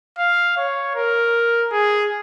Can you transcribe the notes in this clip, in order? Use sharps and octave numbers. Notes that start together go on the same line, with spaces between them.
F5
C#5
A#4
G#4